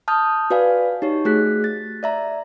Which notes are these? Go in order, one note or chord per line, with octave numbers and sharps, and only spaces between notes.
A5 D#6 F6 G6
F#4 B4 D5 F5 G#5
D#4 G4 C#5
A3 F#4 G#4 F#6 B6
A6
D5 E5 A#5